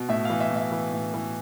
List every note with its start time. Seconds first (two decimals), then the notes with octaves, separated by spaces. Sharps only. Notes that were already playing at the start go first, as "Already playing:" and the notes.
Already playing: B2
0.09 A2 E5
0.25 E3 F5
0.40 E5
0.50 A2
0.56 E5
0.72 E3
0.92 A2
1.14 E3